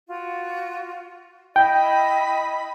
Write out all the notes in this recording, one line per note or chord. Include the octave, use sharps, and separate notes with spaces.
F4 F#4
E4 D#5 G5 B5